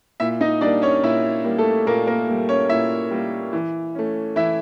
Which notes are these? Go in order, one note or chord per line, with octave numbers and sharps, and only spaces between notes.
A#2 E4 E5
D#4 D#5
G3 A#3 D4 D5
C#4 C#5
A#2 E4 E5
G3 A#3
A3 A4
A#2 A#3 A#4
A#3 A#4
G3 A#3
C#4 C#5
A#2 E4 E5
G3 A#3
E3
A3 C#4
E3 E4 E5